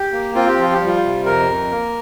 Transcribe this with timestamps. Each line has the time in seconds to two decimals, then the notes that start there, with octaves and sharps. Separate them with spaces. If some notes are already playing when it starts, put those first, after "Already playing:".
Already playing: G4
0.12 A#3
0.35 C4 F4
0.48 G4
0.57 F3 F4
0.73 G4
0.81 G3
0.87 F4
1.03 C3
1.26 F2 A#4
1.49 F2
1.71 A#3